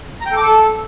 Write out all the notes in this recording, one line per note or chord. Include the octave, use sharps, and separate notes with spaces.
A#5
G5
A4
D6
A4